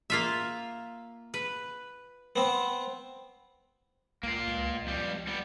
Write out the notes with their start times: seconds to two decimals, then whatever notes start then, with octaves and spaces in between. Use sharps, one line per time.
0.10 A#3 F4 E5
1.34 B4
2.36 B3 C4
4.23 C#2 A#3 F4
4.47 C#2
4.86 F2 G3
5.27 G3 B3